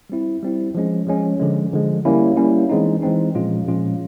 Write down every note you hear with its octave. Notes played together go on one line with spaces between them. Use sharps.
G3 C4 E4
G3 C4 E4
F3 G#3 C#4
F3 G#3 C#4
D3 F3 G#3
D3 F3 G#3
G3 A#3 C#4 E4
G3 A#3 C#4 E4
E3 G#3 C4 D#4
E3 G#3 C4 D#4
A#2 F3 G#3 C#4 F4
A#2 F3 G#3 C#4 F4